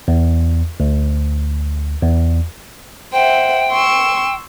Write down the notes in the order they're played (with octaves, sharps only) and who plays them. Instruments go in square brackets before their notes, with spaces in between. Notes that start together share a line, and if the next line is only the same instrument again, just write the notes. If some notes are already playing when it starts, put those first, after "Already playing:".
[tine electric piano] E2
D2
E2
[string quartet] C5 E5 F#5 [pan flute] G5
[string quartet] C6 C#6 E6